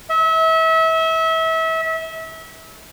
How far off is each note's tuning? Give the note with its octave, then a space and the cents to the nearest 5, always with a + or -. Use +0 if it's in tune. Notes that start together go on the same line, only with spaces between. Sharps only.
E5 -30